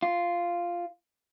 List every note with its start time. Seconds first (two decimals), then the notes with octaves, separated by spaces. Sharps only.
0.02 F4